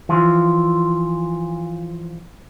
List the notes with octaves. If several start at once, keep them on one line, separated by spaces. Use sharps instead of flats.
E3 F3 F4